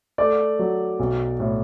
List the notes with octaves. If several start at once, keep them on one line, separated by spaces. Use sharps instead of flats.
A3 D5
F#3
B1
A2